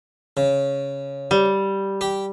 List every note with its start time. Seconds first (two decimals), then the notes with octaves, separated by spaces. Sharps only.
0.37 C#3
1.31 G3
2.01 G4